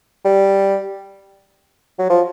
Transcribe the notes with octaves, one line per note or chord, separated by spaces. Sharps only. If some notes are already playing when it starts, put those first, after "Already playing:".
G3
F#3
F3